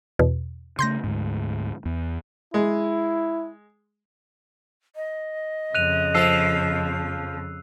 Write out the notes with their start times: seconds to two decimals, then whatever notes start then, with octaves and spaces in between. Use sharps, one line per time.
0.19 E2 B2
0.79 C#3 A3 C6 G6 A#6
1.04 D2 G#2
1.85 E2
2.54 G#3 E4
4.96 D#5
5.75 F2 C#3 F#6 D#7 F7
6.15 F3 A4 E6 C7